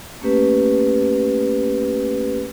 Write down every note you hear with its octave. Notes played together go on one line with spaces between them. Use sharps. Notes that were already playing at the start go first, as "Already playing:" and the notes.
A3 A#3 C#4 G4 B4